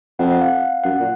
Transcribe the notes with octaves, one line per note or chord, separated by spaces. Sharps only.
F2 F#5
F#5
F5
F#2 F#5
A#2